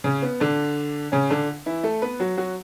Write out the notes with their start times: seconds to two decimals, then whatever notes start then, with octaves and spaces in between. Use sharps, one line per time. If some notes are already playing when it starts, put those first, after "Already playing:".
0.04 C#3 C#4
0.22 B3
0.40 D3 D4
1.12 C#3 C#4
1.30 D3 D4
1.66 E3 E4
1.83 A3 A4
2.02 B3 B4
2.20 F#3 F#4
2.37 F#3 F#4